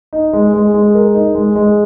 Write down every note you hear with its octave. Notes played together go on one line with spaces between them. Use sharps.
D#4
G#3
G#3
G#3
A#4
D#4
G#3
G#3